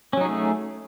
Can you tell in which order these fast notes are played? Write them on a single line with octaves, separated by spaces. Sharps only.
C#4 F#3 D#4 G#4 A3